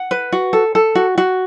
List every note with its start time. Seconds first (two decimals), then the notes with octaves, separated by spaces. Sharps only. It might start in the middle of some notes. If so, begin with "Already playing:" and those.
Already playing: F#5
0.11 B4
0.32 F#4
0.53 A4
0.75 A4
0.95 F#4
1.18 F#4